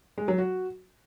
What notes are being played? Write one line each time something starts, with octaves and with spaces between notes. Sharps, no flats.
G#3
F#3
F#4